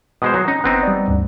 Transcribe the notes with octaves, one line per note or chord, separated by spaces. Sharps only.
B2 G#3 C5 D#6
F#3
C#4 D#4
G1 B3 C4 D#4 F#6
G3 D5
D2 G2